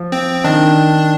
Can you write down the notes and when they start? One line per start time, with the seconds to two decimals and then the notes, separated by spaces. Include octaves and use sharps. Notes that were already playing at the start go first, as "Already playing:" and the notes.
Already playing: F3
0.12 C4
0.44 D#3 D4